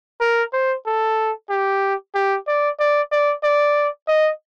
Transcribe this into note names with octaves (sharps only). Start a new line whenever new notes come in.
A#4
C5
A4
G4
G4
D5
D5
D5
D5
D#5